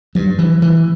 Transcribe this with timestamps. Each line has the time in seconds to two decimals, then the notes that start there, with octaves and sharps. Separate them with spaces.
0.15 G2 F#3
0.39 E3
0.62 E3